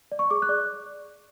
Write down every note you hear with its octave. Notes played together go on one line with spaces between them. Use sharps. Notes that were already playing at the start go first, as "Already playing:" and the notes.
D5
C#6
G#4 D6
F#6
D5